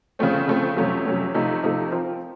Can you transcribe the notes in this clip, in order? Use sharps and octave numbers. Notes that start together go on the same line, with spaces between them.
C#3 F3 A3 C4
C#3 F3 A3 C4
F2 C3 F#3 A3 C#4
F2 C3 F#3 A3 C#4
C3 F3 A3 D#4 A4
C3 F3 A3 D#4 A4
F3 C4 F4 A#4